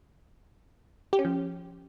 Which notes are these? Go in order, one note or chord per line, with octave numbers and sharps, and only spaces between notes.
G4
C#4
F3